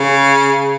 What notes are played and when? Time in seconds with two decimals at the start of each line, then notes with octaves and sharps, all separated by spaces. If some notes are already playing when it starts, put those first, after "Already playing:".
Already playing: C#3